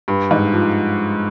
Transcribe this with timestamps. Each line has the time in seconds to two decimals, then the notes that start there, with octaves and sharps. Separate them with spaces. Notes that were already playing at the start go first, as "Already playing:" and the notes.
0.08 G2
0.31 G#2
0.53 F3